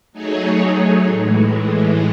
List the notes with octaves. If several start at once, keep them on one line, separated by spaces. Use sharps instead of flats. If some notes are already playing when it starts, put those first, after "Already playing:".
F#3 A3 D#4 G#4 C#5
A2 E3 G#3